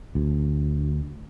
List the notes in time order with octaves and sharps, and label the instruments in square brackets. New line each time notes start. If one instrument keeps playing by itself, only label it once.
[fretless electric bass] D2